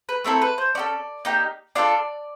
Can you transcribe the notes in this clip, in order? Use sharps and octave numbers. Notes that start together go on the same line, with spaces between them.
B4
A3 C4 E4 A4 A#4
B4
C5
C#4 F#4 A4 D5
A#3 D#4 G4
D4 F4 A4 D5